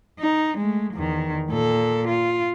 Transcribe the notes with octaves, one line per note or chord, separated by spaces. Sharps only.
D#4
G#3 A3
E2 D#3
A#2 A4
F4